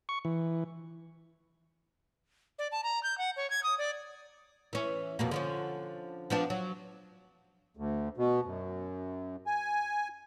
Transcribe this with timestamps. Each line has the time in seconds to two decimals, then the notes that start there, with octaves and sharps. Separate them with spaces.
0.09 C#6
0.25 E3
2.59 D5
2.72 A5
2.83 A#5
3.03 G6
3.18 F#5
3.36 C#5
3.50 G#6
3.63 D#6
3.78 D5
4.73 E3 C#4
5.19 F2 B2 A#3
5.31 D3 F3 C#4
6.30 F3 B3 D4
6.50 F#3
7.77 D2
8.17 B2
8.45 F#2
9.46 G#5